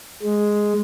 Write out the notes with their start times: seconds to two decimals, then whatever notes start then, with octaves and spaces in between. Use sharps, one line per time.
0.23 G#3